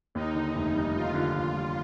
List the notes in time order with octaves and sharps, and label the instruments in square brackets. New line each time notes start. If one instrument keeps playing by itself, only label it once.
[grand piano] D#2 [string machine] D#4
[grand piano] D3
F1
G3
[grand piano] D#2 [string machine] F4
[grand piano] D3
[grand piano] F1 [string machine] F4
[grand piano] G3